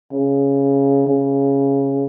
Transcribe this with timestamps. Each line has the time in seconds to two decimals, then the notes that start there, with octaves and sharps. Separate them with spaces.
0.12 C#3
1.07 C#3